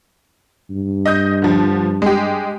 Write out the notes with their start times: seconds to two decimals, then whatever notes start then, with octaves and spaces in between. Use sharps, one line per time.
0.70 G2
1.06 D#5 D#6 G6
1.42 D3 F3
2.02 G#3 G4